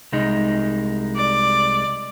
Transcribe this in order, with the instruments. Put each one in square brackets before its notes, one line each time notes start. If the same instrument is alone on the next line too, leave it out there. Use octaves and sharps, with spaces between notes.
[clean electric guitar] C2 G#3 D#4
[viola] D5